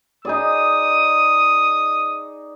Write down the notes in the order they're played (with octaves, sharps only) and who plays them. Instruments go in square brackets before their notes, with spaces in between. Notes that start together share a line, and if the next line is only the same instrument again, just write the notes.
[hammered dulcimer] D#4 G#4 D5 [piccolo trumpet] D#6